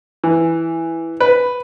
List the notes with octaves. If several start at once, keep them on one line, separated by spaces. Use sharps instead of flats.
E3
B4